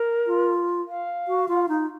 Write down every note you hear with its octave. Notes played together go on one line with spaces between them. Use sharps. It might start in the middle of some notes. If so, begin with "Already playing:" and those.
Already playing: A#4
F4
F5
F#4
F4
D#4